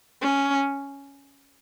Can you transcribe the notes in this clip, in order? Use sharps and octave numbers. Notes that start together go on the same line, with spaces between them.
C#4